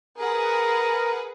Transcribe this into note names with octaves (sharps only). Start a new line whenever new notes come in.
G#4 A#4 B4 F#5